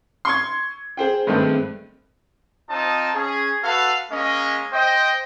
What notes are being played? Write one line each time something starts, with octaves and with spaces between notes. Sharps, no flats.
C6 C#6 G#6
G#4 C5 G5
G2 D#3 G#3 A3 C4
C4 D#4 F4 D#5 A5 D#6
C#4 G#4
F#4 A4 B4 F5
G#3 A#3 C#4 D#5
C5 D#5 G5